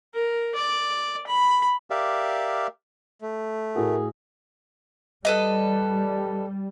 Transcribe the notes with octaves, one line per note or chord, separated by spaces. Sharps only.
A#4
D5
B5
G4 A#4 D5 E5 F5
A3
A2 F#4 G#4 A#4
G3 A4 B4 D#5